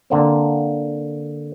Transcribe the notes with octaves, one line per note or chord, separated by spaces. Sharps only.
D3 A#3 C4